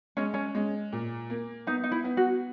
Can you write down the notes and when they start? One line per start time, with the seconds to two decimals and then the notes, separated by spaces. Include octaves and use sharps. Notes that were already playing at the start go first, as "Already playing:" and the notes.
0.17 G#3 C#4
0.34 C#4
0.55 G#3
0.92 A#2
1.30 A#3
1.67 B3 D#4
1.84 D#4
1.92 E4
2.04 B3
2.17 F#4